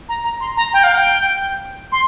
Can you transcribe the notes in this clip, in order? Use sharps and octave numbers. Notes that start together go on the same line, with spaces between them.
A#5
A#5
C6
A#5
G5
F5
G5
C6